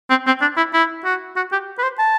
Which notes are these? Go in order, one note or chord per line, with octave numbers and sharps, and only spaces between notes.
C4
C4
D4
E4
E4
F#4
F#4
G4
B4
C5
A5